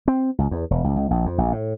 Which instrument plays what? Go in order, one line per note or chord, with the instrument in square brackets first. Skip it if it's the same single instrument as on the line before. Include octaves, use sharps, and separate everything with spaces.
[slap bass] C4
C#2
E2
E1
C#2
C#2
A#1
F2
A#1
A2